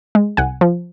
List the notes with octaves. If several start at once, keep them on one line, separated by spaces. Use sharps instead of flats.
G#3
C2 F#5 G#5
F3